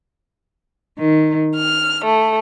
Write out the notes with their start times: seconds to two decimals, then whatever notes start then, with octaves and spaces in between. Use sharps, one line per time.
0.98 D#3
1.55 F6
2.05 A3